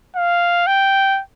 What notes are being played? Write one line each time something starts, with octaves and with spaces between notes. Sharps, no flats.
F5
G5